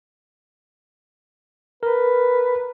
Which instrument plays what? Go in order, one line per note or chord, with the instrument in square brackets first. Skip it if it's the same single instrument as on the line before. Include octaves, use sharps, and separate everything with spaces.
[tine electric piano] A#4 [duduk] B4